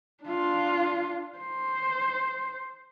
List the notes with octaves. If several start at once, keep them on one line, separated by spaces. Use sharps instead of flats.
D4 F4
C5